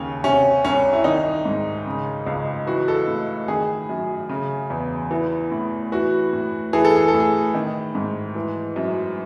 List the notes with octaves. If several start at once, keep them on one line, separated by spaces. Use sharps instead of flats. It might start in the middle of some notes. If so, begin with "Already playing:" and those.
Already playing: D#2 C#3 C#4
C3 C#4
C2 C#4
E4
D#3 D#4
G#2
C#3
C#2
E3 F#4
A4
A2
D#3 G#4
F#2
C#3
E2
E3
A2
E3 F#4
A2
E3 G#4
A4
G#4
A4
A2
G#4
D#3
G#2
E3
F#2